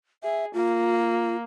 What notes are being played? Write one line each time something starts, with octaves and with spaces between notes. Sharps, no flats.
G#4 E5
A#3 F4